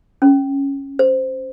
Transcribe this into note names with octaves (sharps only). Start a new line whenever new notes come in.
C#4
C5